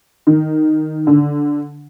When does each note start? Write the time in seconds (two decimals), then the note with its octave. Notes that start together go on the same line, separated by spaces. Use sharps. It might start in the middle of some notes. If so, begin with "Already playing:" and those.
0.27 D#3
1.07 D3